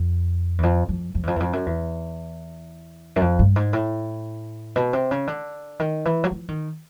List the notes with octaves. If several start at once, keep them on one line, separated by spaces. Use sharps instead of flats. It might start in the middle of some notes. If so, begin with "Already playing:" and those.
Already playing: F2
E2
F2
F2
F2
E2
F2
E2
F2
F#2
E2
F#2
F2
G2
G#2
A2
B2
C3
C#3
D3
D#3
E3
F#3
F3
D#3